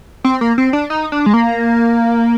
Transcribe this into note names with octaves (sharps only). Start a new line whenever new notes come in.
C4
A#3
C4
D4
D#4
D4
G#3
A#3